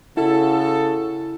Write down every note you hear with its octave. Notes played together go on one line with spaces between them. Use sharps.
C#3 E4 F#4 A4